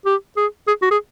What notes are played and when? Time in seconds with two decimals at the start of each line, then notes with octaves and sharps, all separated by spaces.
0.06 G4
0.37 G#4
0.67 G#4
0.82 F#4
0.91 G#4